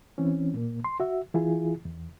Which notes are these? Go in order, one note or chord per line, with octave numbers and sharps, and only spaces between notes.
E3 C4 C#4
A#2 A#3
C6
F#4 E5
E3 E4 F4 G#4
E2